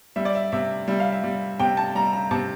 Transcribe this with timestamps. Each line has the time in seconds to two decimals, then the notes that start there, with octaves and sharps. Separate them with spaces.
0.16 G3 E5
0.25 D5
0.35 E5
0.52 C3 E5
0.88 G3 E5
1.00 F5
1.12 E5
1.24 G3
1.60 C3 G5
1.77 A5
1.95 G3 A#5
2.13 A#5
2.31 C3 A5